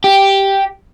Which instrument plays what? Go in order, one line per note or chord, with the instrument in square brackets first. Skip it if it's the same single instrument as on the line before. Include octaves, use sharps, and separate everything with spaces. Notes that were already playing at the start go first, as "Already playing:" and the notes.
[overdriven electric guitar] G4